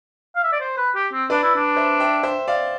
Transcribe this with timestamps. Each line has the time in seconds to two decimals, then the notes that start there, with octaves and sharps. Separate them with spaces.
0.35 F5
0.43 E5
0.52 D5
0.60 C5
0.77 B4
0.95 G4
1.13 C4
1.30 D4 B4 D5
1.43 E4
1.55 D4
1.76 C5 E5
2.00 E5 G5
2.23 C5 E5
2.48 D5 F5